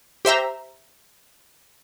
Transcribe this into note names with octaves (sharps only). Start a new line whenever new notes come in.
G4 C5 E5 A#5